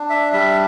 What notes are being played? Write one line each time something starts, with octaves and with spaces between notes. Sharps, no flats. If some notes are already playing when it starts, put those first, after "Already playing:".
Already playing: D4
E5
G3 E5